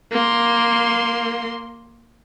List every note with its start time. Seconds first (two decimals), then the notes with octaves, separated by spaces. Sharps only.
0.12 A#3 C6